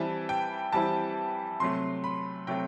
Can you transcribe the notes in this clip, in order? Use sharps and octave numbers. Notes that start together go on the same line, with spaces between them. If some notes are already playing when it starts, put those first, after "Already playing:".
Already playing: E3 G3 C4 E4 A5
G5
E3 G3 C4 E4 A5
C3 F#3 A3 C6
B5
C3 F#3 A3 G5